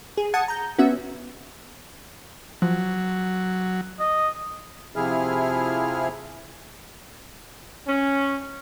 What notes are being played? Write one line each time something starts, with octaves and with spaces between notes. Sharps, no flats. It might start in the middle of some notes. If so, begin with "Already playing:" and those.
G#4
F#5 A5 D#6 G#6 C#7
A#5 G6
B3 C#4 F#4 E5
F3 F#3
D#5
C3 F3 E4 G#4 F6
C#4